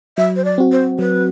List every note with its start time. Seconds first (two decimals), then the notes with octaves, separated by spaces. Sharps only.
0.17 F#3 E5
0.36 C5
0.44 D5
0.58 C4 F#4
0.72 C5
0.99 F#3 B4